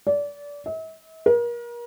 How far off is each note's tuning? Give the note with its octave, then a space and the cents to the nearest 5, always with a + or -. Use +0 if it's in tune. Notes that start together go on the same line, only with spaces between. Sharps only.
D5 -25
E5 -45
A#4 +35